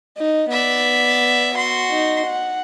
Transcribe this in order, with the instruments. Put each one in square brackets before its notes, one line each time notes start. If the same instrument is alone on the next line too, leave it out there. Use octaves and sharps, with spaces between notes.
[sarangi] D#4
[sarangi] B3 [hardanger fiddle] D5 E5
[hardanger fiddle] F#4 C6
[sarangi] D#4
F#5